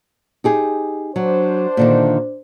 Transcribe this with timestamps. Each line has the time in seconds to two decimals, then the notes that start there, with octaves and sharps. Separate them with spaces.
0.44 D#4 G4 G#4
1.16 F#3 D4 C5
1.77 A#2 D3 D#3